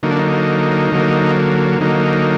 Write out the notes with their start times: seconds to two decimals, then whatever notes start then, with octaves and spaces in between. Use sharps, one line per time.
0.03 D3 F#3 A#3 D#4
0.10 D4
0.19 D#4
0.92 D3 F#3 A#3
1.80 D3 F#3 A#3 D#4